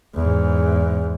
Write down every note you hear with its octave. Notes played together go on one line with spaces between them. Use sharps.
E2 G#2